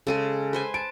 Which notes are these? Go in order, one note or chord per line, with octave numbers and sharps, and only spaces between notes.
C#3 G#3 G#4 A4 D#7
B4 C5 G#5
A5 D7